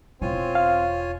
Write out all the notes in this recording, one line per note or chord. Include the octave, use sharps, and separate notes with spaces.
E1 C4 E4 F4 C#5 G#5
F5